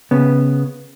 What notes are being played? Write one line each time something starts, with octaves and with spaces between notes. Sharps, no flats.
C#3 B3